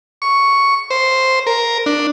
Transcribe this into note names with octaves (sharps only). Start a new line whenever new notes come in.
C#6
C5
A#4
D4